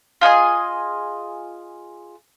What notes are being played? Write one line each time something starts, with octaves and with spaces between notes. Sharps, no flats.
F4 G#4 D#5 G#5